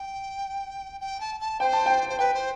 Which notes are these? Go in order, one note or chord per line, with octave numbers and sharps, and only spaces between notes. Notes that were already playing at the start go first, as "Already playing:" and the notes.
Already playing: G5
G5
A5
A5
C5 G5
A5
G5
C5
B4 G5
C5